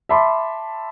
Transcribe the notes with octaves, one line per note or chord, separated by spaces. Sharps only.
E5 A5 B5 C6 D6